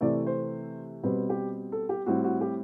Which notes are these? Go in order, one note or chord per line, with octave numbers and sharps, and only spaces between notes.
C3 E3 A3 C4 D5
C5
B2 G3 C4 B4
G4
A4
G4
A2 G3 C4 F#4
F#4
G4